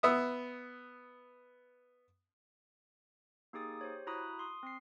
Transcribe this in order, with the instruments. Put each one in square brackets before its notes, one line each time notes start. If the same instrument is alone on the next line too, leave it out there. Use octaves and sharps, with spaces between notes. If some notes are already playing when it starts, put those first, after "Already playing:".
[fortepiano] B3 E5 D#6
[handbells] A#3 D#4 G4 G#4 D#6 A6
G4 C5 C#5
E4 F#4 A#5 B5 D#6 F#6
C6 D#6
C4 C7